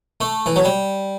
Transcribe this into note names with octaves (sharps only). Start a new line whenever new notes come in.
A3
E3
F#3
G3